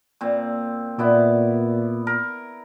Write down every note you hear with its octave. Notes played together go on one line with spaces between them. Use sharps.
A#2 C4
A#2 B3 E4 D5
A#4